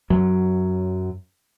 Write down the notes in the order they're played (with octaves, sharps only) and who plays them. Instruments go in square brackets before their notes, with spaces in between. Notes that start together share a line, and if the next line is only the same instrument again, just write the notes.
[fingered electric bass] F#2 F#3